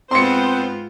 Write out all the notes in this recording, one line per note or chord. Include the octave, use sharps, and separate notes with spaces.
G#2 B3 C4 F4 C5 C6 C#7